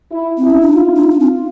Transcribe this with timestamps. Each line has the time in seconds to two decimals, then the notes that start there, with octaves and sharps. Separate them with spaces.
0.12 E4
0.38 C4
0.43 E4
0.50 C#4
0.61 D4
0.73 D#4 F4
0.96 D4
1.04 D#4
1.12 D4
1.20 C4 F4